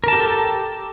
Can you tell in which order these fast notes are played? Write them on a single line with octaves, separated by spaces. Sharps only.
A#4 A5 G4 A4